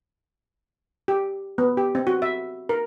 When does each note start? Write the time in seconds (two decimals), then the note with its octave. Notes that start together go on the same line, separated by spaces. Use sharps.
1.08 G4
1.58 B3
1.77 G4
1.95 C4
2.07 F#4
2.22 E5
2.69 A#4